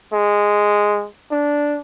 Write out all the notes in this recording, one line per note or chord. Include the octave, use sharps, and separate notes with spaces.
G#3
D4